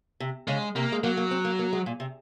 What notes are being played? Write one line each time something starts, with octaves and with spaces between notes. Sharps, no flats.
C3
C#3 G#3
C3 A#3
G#3
F#3 A#3
A#3
C4
A#3
A#3
G#3
A#2
C3